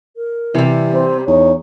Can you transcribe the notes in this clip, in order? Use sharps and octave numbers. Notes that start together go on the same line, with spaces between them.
A#4
C3 E3 G3
C4
E2 D#4 C#5